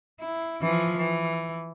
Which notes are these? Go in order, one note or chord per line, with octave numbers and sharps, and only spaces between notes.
E4
E3 F3
E3